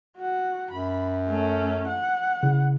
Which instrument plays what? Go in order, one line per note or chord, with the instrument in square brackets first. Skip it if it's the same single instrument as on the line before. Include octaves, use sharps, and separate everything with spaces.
[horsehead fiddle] F#4 F#5
[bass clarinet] F#2 [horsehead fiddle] B5
[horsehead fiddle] A3 C#4
F#5
[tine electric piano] C#3 E4